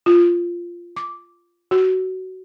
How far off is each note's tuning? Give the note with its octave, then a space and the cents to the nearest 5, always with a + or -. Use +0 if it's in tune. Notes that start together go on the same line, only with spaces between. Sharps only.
F4 -5
D6 -10
F#4 +15